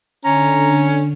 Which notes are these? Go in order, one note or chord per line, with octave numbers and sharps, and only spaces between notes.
D3 C#4 A#5